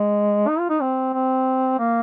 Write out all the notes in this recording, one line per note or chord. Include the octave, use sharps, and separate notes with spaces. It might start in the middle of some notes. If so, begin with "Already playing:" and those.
Already playing: G#3
D#4
F4
D#4
C4
C4
A#3